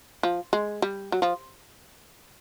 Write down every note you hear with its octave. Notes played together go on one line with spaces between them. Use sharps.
F3
G#3
G3
F#3
F3